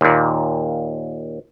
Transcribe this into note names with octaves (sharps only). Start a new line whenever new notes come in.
D#2 A#2